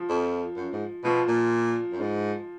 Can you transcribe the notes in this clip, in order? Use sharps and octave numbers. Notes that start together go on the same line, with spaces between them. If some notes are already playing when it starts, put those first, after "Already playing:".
Already playing: F3
F2
F#2
G#2
B2 F3
A#2
F#2
G#2